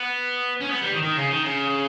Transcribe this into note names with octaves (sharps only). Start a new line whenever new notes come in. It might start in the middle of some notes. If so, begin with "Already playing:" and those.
Already playing: B3
C#4
B3
G3
D#3
D#3
C#3
D#3
C#3